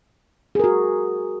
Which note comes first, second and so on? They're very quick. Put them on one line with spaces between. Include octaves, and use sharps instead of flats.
G#4 A#4 F#4